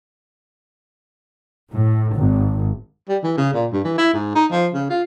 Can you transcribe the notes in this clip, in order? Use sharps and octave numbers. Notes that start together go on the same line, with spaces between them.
A2
G#1
G3
E3
C#3
A#2
G2
E3
E4
G#2
D#4
F3
C#3
F4